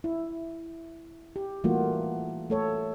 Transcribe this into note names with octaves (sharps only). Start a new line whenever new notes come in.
E4
G4
E3 G3 A3 A#3 F4 F#4
A3 A4 C#5